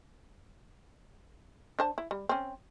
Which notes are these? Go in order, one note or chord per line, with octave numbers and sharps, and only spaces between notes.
D4 C5 A5
E4
G3
C4 C#4